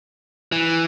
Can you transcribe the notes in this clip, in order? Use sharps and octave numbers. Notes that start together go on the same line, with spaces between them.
E3